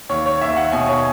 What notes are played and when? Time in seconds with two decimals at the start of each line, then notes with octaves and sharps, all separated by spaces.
0.09 D#2 C#5
0.26 C#5
0.41 D#2 E5
0.56 F#5
0.72 B2 G#5
0.88 C#5